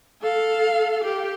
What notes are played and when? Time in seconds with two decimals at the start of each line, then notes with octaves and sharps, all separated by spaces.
0.22 A4 F5
1.04 G4